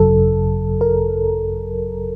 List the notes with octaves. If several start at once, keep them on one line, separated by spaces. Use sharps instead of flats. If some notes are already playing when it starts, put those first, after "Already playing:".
Already playing: G#1 F#2 C#3 F#3 A4
A#4